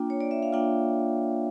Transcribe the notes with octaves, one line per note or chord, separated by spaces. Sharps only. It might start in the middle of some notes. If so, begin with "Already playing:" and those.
Already playing: A#3 D4 F4 G5
C#5
D5
E5
F5
A#3 D4 F4 G5